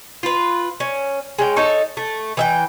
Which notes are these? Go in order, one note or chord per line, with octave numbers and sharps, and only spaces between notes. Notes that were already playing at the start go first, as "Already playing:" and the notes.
F4 B4
C#4
G#3 C#4 G5
D#4 A4 C#5
A3
E3 E5 G5